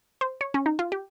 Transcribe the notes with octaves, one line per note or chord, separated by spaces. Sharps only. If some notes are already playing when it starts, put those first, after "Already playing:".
C5
C#5
C#4
D#4
F4
G4